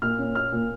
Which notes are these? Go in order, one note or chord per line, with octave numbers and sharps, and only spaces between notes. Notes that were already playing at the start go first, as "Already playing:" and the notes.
A#2 F6
C#4
A#2 F6
A#2